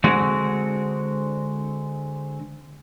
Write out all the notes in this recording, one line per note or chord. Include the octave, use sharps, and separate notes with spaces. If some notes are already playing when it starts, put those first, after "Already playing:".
D3 G#3 C4 F#4